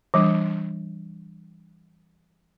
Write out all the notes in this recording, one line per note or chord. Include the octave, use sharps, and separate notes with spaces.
E3 G3 D4